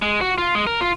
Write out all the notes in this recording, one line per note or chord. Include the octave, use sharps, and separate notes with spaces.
G#3
F#4
F4
G#3
A#4
F4